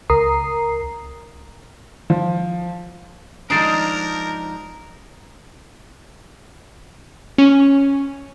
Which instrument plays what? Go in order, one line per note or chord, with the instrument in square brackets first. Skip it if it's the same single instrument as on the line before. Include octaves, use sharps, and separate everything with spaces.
[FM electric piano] C#2 A#4 A#5 D#6 C7
[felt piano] F3
[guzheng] F3 G#3 D4 [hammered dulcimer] D#4 [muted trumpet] A#4 [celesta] A6 C7 D7
[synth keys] C#4